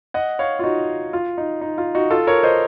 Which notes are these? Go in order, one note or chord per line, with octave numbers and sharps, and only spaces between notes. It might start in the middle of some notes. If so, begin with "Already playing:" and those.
D#5 F#5
C#5 F5
F4
D#4 F#4
F4
D#4
D#4
F4
D#4 F#4
F4 A4
A#4 C#5
C5 D#5